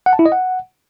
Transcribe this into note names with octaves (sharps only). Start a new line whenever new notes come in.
F#5
A5
E4
D#5
F#5